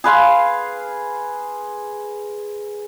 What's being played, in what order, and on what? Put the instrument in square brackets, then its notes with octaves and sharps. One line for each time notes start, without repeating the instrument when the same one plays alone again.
[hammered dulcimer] G#4 B4 F5 C6